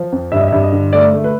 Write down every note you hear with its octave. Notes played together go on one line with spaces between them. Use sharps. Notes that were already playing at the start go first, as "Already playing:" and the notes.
Already playing: F3
F2
G2 E5
D#5
E5
G2
D#5
D3
A3 D5
A3
B4